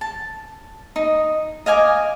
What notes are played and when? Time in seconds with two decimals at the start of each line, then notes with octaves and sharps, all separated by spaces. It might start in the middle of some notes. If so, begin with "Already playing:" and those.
0.01 A5
0.96 D#4
1.66 D#5 F5 G#5 D6